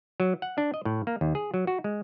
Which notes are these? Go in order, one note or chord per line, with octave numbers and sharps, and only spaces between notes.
F#3
F#5
D4
D#5
A2
A#3
D#2
G#4
F#3
F#4
G#3